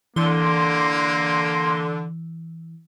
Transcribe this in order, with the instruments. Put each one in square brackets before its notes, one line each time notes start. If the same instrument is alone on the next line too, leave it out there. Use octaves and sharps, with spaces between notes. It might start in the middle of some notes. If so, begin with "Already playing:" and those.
[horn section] D3 [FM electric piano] E3 [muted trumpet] A#3 [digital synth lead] C6